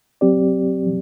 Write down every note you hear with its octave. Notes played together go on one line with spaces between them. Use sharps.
F#3 C4 G4 D5